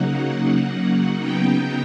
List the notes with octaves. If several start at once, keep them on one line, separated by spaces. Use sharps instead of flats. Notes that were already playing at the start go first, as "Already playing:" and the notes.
Already playing: C#3 F#3 A#3 D#4 F#5
C#3 F#3 B3 D#4 G5